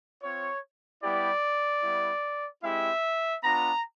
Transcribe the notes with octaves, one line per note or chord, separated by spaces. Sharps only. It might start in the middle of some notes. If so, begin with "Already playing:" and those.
C4 F4 C#5
G3 B3 E4 G4 D5
G3 B3 E4
G#3 C4 E4 G4 E5
B3 D4 F4 A#5